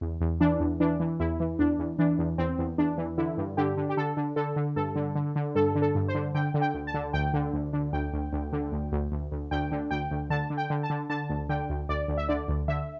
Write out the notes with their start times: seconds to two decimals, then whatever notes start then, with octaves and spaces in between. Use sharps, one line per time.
0.01 E2
0.21 E2
0.40 E3 D4
0.60 E2
0.80 E3 D4
1.00 E3
1.20 E2 E4
1.40 E3
1.59 E2 D4
1.79 E2
1.99 E3 D4
2.19 E2
2.38 E2 C4
2.58 E2
2.78 E2 D4
2.98 E3
3.18 D3 E4
3.37 G2
3.57 D3 G4
3.77 D3
3.89 G4
3.97 D3 A4
4.17 D3
4.36 D3 A4
4.56 D3
4.76 G2 A4
4.96 D3
5.15 D3
5.36 D3
5.55 G2 A4
5.75 D3
5.82 A4
5.95 G2
6.08 C5
6.15 D3
6.35 D3 G5
6.54 D3
6.61 G5
6.74 D2
6.87 A5
6.94 D3
7.13 D2 G5
7.34 D3
7.53 D2
7.73 D3
7.93 D2 G5
8.13 D2
8.33 D2
8.53 D3
8.72 D2
8.92 D2
9.12 D2
9.32 D2
9.51 D2 G5
9.71 D3
9.91 D2 G5
10.11 D2
10.30 D3 A5
10.50 D3
10.57 G5
10.70 D3
10.83 A5
10.90 D3
11.10 D3 A5
11.29 D2
11.49 D3 G5
11.70 D2
11.89 D2 D5
12.08 D2
12.17 E5
12.29 D3 D5
12.48 D2
12.68 D3 E5